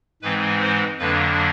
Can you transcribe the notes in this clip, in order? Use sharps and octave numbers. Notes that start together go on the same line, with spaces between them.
G#2 E3 G#3 C4 B4
C5
F2 D3 F#3 A#3 D4 B4